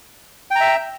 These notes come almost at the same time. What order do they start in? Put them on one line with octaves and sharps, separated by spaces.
G5 A#5 E5